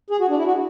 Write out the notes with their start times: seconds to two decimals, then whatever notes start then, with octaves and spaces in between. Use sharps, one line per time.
0.10 G#4
0.20 F#4
0.29 D4
0.37 E4
0.46 F#4